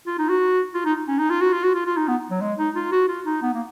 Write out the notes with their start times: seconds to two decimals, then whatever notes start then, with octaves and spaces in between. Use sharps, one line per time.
0.07 F4
0.19 D#4
0.29 F#4
0.74 F4
0.85 D#4
1.08 C#4
1.19 D#4
1.30 F4
1.41 F#4
1.53 F4
1.63 F#4
1.75 F4
1.86 F4
1.97 D#4
2.08 B3
2.31 F#3
2.41 G#3
2.58 D#4
2.76 F4
2.92 F#4
3.09 F4
3.26 D#4
3.42 B3
3.54 A#3